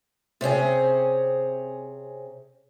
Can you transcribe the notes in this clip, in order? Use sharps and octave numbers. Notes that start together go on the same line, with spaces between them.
C3 C4 C#4 G#4